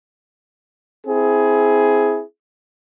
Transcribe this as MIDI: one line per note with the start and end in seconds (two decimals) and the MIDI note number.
1.07 2.23 60
1.07 2.23 64
1.07 2.23 68